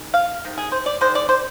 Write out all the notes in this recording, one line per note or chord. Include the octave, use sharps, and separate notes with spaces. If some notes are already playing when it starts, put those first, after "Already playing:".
Already playing: D#3 G#3
F5
C3 D#3
G#4
C5
D5
D#3 G#3 C5
D5
C5